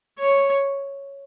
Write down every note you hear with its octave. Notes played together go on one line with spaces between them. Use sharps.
C#5